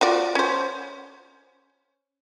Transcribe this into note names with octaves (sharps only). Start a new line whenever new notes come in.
F4 F#4 D5
C#4 C5